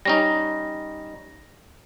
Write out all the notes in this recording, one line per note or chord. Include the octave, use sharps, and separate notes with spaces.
G3 C#4 D#4 A#6